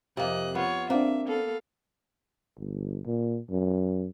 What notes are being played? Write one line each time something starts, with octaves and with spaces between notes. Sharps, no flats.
F2 C3 A#3 D#5 F#6
B3 F4 C#5
A#3 C4 D4 E5
B3 A4 F5
G1
A#2
F#2